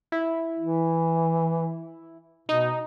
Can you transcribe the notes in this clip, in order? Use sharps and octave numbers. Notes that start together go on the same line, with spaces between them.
E4
E3
B2 D#4